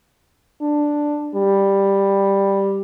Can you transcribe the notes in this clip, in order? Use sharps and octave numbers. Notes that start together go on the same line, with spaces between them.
D4
G3